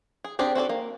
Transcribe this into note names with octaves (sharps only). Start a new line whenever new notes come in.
G#4
C4 D4 G4 G#4
C4 F#4 A4 D5
A#3